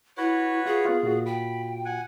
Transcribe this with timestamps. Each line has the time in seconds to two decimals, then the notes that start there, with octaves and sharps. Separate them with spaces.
0.17 E4 F#4 B4 C#5
0.66 F4 G#4
0.85 B3 F4
1.03 A#2 F4 F#4
1.26 G5 B5
1.85 F#5 G#5